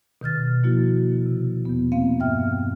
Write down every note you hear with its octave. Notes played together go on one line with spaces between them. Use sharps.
B2 D#3 F6 A6
F3 A#3 E4 F#4
C3
E2 B3
A#3 C4 F5
G2 E5 G5 F6